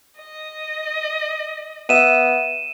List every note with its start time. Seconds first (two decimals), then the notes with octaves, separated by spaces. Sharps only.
0.18 D#5
1.89 B3 E5 D#7 E7